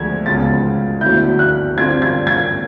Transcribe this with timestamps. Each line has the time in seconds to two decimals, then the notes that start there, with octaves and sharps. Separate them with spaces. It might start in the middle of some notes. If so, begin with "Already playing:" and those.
Already playing: D2 D3 F3 G#3 G#6
0.26 C#2 C#3 F3 G#3 B3 A6
1.01 D2 D3 F#3 B3 E4 G6
1.39 F#6
1.77 D3 G3 C4 F4 G#6
2.02 G#6
2.27 G#6